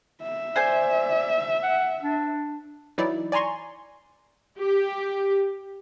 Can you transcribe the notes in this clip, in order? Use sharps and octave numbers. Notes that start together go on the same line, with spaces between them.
E5
C5 D5 G#5 G6
F#5
D4
E3 F#3 D#4 E4 D5
D5 G#5 A#5 C6 C#6
G4